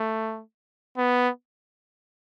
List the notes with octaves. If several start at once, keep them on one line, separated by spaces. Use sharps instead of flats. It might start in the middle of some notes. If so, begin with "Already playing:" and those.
Already playing: A3
B3